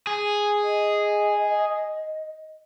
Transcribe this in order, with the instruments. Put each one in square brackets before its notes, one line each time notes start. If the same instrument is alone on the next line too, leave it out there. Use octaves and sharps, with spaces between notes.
[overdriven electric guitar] G#4
[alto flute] D#5